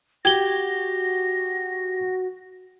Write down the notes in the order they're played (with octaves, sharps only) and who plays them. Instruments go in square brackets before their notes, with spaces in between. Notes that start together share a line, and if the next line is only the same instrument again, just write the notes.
[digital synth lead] F#4 [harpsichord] G4 [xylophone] G#6 G7 [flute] A#6